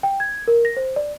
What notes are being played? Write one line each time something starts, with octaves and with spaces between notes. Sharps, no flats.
G5
G#6
A#4
A#6
C5
D5